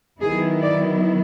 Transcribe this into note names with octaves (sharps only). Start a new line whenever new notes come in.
D#3 F#3 B3 E4 G#4
D5